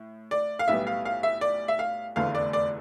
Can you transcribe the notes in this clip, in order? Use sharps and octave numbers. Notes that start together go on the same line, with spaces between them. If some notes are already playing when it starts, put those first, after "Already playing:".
Already playing: A2
D5
F5
B1 A2 G3 B3 E5
F5
F5
E5
D5
E5
F5
F1 E2 D3 A3 F5
D5
D5